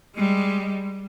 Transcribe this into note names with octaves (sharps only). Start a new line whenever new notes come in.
G3 G#3